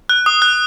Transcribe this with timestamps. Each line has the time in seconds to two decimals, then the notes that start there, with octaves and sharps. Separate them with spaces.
0.09 F#6
0.26 D#6
0.42 F#6